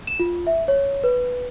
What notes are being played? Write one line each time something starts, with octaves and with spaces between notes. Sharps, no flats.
E7
F4
E5
C#5
B4